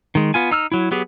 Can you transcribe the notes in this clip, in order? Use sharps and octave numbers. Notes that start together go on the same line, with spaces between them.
D#3 G#3
B3 F4 G#5
D#4 E6 F6
F#3 E4
F#3 B3 G4 G#4